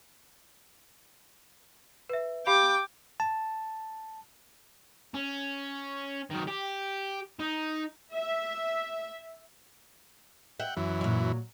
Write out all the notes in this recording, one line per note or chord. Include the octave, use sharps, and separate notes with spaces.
B4 E5
G4 F5 G5 B5 D6
A5
C#4
D#3 F#3
G4
D#4
E5
E5 F#5 G5
F#2 E3
A#2 F#3